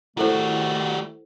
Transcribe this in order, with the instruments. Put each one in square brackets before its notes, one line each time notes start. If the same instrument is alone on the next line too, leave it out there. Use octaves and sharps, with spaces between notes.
[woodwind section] D#3 A3 [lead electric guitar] G3 F#4 [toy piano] E4 A4 C5